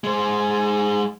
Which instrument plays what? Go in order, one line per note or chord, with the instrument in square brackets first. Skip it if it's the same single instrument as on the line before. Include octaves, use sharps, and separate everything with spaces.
[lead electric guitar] G#3 C5